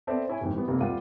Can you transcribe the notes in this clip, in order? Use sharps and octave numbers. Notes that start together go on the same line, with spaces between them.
B3 C4 A4 D5 E5 A5
C#4 E4 E5 G#5
D#1 F2 G#2
E3 G3 B3
F1 A#3
D#1 G3 F4 F#5 D#7